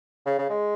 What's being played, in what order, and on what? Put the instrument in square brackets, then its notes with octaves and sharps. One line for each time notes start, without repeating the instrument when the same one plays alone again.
[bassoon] C#3
C#3
G#3